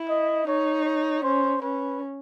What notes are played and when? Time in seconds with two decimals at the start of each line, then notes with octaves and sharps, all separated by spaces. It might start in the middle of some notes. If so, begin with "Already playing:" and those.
Already playing: E4
0.09 D#5
0.47 D#4 C#5
0.85 C#5
1.23 C#4 C5
1.62 C#4 B4